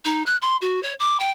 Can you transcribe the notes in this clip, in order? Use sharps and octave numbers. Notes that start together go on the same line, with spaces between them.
D#4
F#6
C6
F#4
C#5
D6
G5